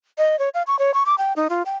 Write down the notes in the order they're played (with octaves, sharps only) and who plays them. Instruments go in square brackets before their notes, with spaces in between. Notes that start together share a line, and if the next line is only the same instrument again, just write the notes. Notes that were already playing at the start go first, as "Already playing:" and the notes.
[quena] D#5
C#5
F5
C#6
C#5
C#6
D6
G5
D#4
F4
G5